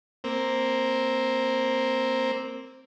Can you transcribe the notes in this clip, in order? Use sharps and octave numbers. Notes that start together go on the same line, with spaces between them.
A#3 C4